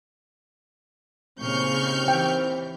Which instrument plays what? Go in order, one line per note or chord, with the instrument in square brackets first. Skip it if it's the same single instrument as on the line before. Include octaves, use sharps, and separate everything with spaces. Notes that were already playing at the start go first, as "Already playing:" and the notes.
[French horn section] D#2 C4 [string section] A#2 C#3 [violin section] C#6 F6 G6
[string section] E3 [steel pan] G5